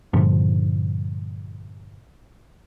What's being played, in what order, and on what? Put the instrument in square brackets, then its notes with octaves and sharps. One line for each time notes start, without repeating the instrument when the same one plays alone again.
[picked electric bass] G2 A#2 D3 F3